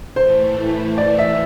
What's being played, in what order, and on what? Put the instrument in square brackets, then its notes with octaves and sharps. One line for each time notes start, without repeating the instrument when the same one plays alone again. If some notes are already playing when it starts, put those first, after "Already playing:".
[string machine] A2 E3 A3 [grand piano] C5
[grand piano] D5
E5